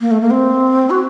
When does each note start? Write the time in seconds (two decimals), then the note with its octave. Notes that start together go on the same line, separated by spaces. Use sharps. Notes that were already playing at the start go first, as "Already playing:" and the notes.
0.01 A#3
0.11 A3
0.21 A#3
0.31 C4
0.90 F#4